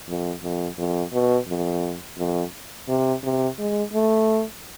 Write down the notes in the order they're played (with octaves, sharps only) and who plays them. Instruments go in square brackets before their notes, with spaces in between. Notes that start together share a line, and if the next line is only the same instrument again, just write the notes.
[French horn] F2
F2
F2
B2
F2
F2
C3
C3
G#3
A3